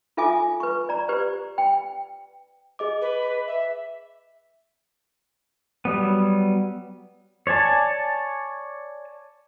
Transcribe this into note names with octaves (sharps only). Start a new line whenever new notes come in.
F4 A4 E5 G#5 D6
B4 C#6
D5 A#5
G4 B4 C5 D5
G5
G#4 D#5 D6
B4
E5
F#3 G3 B3
C#5 D5 G#5 A5